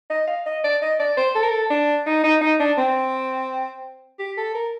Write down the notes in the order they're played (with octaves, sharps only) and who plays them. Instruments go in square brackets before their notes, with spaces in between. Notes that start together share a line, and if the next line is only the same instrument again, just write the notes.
[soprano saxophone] D#5
F5
D#5
D5
D#5
D5
C5
A4
A#4
A4
D4
D#4
D#4
D#4
D4
C4
G4
A4
A#4